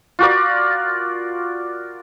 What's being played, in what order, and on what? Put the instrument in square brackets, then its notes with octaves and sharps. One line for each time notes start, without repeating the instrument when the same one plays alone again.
[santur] F4 F#4 A#4 D5